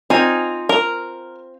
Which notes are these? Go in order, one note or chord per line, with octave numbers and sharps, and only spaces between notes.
C4 D#4 F4 G#5
A#4